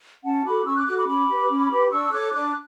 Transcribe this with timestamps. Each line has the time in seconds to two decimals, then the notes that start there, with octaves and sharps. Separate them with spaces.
0.24 C#4 F#5 A5
0.45 F#4 A4 B5 D6
0.66 C#4 C#6 E6
0.76 D6 F#6
0.87 F#4 A4 D6 F#6
0.97 B5 D6
1.08 C#4 B5 D6
1.28 G4 B4
1.50 C#4
1.71 G4 B4
1.91 D4 C#6 E6
2.12 A4 C#5 D6 F#6
2.33 D4 D6 F#6